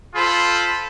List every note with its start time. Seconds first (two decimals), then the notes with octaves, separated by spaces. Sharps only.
0.15 F4 A4 C5 B5